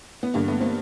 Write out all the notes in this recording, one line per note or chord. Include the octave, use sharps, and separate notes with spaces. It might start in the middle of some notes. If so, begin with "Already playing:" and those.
B3
G2 D3 A#3
A3 B3
A#3 C4